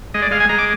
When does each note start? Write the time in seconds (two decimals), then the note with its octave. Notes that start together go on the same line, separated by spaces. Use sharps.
0.14 G#3 D#5
0.22 D5
0.31 G#3 F5
0.40 G#5
0.49 G#3 A#5
0.58 D6